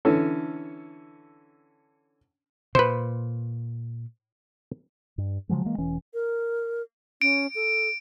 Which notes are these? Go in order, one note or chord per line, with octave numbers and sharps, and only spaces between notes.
D3 E3 C#4 A4
A#2 B4 C5
G2
C#3 F3 F#3 G#3
E3 G#3 A#3
E1 E3 C#4
A#4
C#4 D7
A4